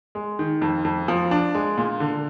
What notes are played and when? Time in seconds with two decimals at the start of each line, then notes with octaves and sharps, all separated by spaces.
0.15 G#3
0.39 D#3
0.62 F2
0.85 F2
1.08 F3
1.31 D4
1.55 G#3
1.78 A#2
2.00 D3